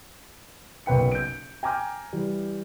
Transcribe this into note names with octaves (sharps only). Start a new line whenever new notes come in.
F#1 B1 B4 G5 C#7
G6 D7
G5 G#5 A#5 D6 F6 G6
E3 G3